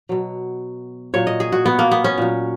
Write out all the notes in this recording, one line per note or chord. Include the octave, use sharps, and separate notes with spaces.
B2 F#3
A#2 F#3 C#5
D#5
G#4
F#4
B3
A#3
B3
C#4
A#2 F#3